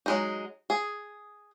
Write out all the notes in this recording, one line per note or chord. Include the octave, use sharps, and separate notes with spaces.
F#3 G#3 D#4
G#4